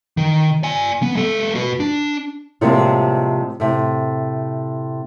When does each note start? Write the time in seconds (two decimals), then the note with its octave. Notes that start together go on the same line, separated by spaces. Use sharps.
0.17 D#3
0.63 D5 G#5
1.02 B3
1.14 G#3 A4
1.55 F#4 B4
1.80 D4
2.61 A2 C3 F3 G3 G#3 A#3
3.60 A2 C3